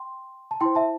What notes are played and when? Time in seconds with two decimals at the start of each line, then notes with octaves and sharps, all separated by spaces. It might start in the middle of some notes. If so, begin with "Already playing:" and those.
Already playing: G5 C6
0.51 A5
0.61 E4 C5 G5 C6
0.75 E5 A5